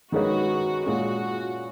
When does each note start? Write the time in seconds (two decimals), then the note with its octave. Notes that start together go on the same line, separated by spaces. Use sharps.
0.12 D#3 G#3 C#4 F#4 G#4 B4
0.85 A#2 G#3 C#4 F#4